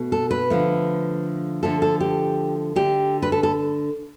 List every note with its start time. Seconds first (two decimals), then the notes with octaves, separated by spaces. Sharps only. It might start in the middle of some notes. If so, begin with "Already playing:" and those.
Already playing: B2 A3
0.12 A4
0.31 B4
0.50 D3 F3 A3
1.63 D3 F3 A3 A4
1.82 A4
2.00 G4
2.76 D3 A3 G4
3.22 B4
3.32 A4
3.43 A4